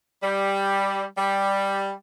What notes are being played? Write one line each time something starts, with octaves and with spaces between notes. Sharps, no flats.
G3
G3